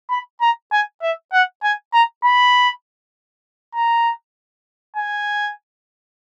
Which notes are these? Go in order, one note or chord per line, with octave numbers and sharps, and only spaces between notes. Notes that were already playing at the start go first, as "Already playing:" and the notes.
B5
A#5
G#5
E5
F#5
G#5
A#5
B5
A#5
G#5